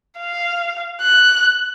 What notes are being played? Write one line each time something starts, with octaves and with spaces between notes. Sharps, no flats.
F5
F#6